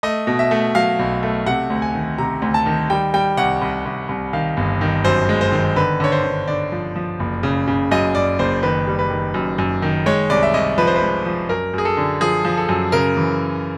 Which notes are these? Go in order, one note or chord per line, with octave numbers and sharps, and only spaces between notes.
A3 D#5
B2
E5
A3
F#3 F5
B1
A3
C3 F#5
D2
G#5
D#3
C3 A#5
D2
A5
D#3
G3 G5
G3 G5
C2 F#5
C2
C2
C2
D#3 F5
G1
D#3
F#2 C5
G#3
C5
D#3
D3 B4
D3 C#5
C5
D3
D3 D5
F3
F3
F#1
C#3
C#3
F#2 D#5
F#2 D5
F#1 C5
D#3 B4
G3
B4
D#3
F#2
F#2
D#3
G#3 C#5
C2 D5
E5
C2 D#5
F3 B4
C5
B4
G#3
F3
F#2 A#4
F#2 G#4
A4
D3
F3 G#4
F3
A4
F#2
C#3 A#4
E3